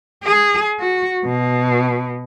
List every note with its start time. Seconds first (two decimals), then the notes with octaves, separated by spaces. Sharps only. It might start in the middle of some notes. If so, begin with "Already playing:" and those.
0.23 G#4
0.80 F#4
1.25 B2